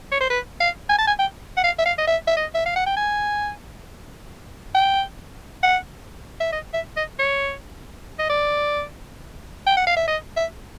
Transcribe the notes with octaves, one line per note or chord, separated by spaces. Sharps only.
C#5
C5
B4
F5
G#5
A5
G#5
G5
F#5
F5
E5
F5
D#5
E5
E5
D#5
E5
F5
F#5
G5
G#5
G5
F#5
E5
D#5
E5
D#5
C#5
D#5
D5
G5
F#5
F5
E5
D#5
E5